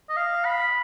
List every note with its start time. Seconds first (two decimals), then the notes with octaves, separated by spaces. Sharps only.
0.09 D#5
0.17 F5
0.45 B5